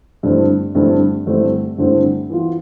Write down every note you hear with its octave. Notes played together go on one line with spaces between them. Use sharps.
G2 D3 A3 C4 E4
G2 D3 A3 C4 E4
G2 D3 A3 C4 E4
G2 D3 A3 C4 E4
E3 B3 F4